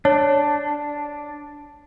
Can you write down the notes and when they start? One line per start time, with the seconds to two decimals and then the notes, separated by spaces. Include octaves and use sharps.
0.05 D4 C#5